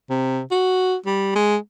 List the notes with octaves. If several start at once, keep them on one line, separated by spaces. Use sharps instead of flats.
C3
F#4
G3
G#3